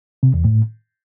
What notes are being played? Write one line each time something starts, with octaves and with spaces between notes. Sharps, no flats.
C3
E2
A2